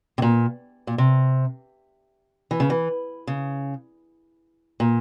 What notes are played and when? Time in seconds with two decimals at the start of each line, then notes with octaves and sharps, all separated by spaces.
0.18 C3
0.22 A#2
0.87 A#2
0.98 C3
2.51 E3
2.60 C#3
2.70 E3
3.27 C#3
4.80 A#2